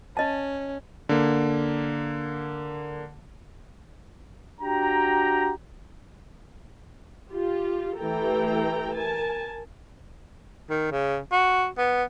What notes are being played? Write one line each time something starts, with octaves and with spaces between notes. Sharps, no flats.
C#4 D#5 A5
D3 A#3
D4 F#4 G4 G5 A#5
F4 G4
E3 A3 G4 A4 G5 A#5
A#4 G#5 A5
D#3
C#3
F#4
B3